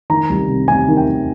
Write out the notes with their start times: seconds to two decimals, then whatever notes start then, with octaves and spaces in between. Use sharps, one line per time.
0.10 D#3 A#5
0.30 C2
0.48 C3
0.68 C3 G#5
0.88 D#3
0.97 G5
1.08 D#3